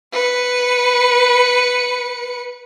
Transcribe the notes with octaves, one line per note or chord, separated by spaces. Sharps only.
B4 C#7